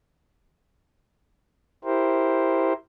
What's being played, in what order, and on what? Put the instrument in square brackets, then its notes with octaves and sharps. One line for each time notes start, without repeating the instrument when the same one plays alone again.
[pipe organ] E4 G4 A#4 C5